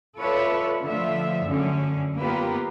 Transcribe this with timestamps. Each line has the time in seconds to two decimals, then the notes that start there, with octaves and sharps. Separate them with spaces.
0.18 F4 A4 B4 C#5 D5 E5
0.84 D3 F3 A3 F4 E5
1.44 F#2 D3 C#4
2.18 A#3 B3 F4 G4 A#4 B4